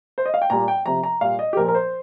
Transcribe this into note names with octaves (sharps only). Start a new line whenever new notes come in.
C5
D#5
F5
G5
A#2 G3 A#5
G5
C3 F3 A#5
A#5
A#2 G3 F5
D#5
G4
A#2 F3 A#4
A#4
C5